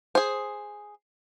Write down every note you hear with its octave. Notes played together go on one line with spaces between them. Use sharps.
G#4 C5